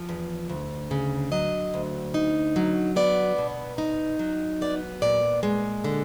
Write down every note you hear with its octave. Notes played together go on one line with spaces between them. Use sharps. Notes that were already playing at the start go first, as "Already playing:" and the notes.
Already playing: F3
E2
D2
C#3
F#3 D#5
D2
D#4
F#3
B3 D5
B2
D#4
F#3
B3 D5
A#2 D5
G#3
D3